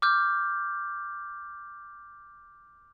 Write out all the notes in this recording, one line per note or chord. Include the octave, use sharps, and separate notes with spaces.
D6 F6 G6